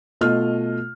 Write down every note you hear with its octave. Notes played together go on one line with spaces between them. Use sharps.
B2 A3 F4 D#5 F6